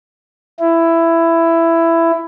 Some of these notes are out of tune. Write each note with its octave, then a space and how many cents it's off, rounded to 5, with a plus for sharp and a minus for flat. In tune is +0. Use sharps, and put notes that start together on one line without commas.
E4 +10